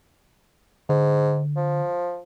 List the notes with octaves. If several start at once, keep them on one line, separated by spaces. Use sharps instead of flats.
G#2 D3
F3